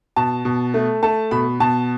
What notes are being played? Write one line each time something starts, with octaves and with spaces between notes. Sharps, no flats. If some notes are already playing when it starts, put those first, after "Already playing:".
B2 A5
B2
A3
A3 A5
B2 B5
B2 A5